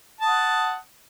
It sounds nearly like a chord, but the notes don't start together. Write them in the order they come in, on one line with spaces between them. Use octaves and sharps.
A5 D#6 F#5